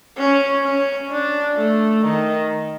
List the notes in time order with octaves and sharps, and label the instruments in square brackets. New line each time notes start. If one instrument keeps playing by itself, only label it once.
[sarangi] C#4
C#4
D4
A3
D#3